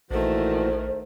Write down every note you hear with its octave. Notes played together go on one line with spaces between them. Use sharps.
A#1 A#2 D#3 E3 A3 F#4 C5